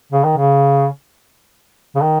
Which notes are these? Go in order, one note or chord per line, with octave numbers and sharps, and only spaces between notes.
C#3
D#3
C#3
C#3
D#3